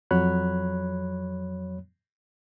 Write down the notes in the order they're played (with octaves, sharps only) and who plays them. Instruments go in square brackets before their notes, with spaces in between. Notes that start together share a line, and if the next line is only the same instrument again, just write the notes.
[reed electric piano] F2 F#3 C#5 B5 F#6